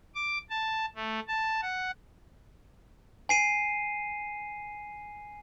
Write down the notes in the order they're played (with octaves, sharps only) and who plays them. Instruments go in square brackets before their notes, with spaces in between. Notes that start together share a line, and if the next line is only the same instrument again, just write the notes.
[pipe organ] D6
A5
A3
A5
F#5
[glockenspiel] G#5 C7 D#7